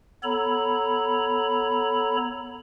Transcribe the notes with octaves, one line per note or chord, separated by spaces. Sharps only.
B3 A4 C#5 A#5 B5